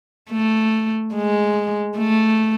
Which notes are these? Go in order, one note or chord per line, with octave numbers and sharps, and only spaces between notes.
A3
G#3
A3